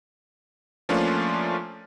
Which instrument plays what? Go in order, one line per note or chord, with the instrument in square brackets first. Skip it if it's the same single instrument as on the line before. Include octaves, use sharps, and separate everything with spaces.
[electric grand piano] F3 A3 A#3 C#4 D4 F4